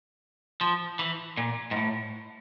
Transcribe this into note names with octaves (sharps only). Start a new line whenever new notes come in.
F3
E3
A#2
G#2
A2